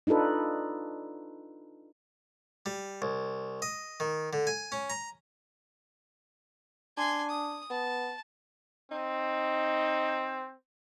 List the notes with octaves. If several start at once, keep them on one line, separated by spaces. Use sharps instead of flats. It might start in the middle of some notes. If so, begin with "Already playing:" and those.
D4 D#4 F4 A4 B4
G3
C2
D#5
D#3
D3
G#5
C#4
A#5
D4 G#5 C6
D#6
B3 A5
C4 D#4